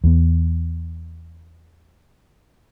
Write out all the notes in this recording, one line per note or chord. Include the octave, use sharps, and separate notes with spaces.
E2 B3